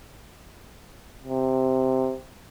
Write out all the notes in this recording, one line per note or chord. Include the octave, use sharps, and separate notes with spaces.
C3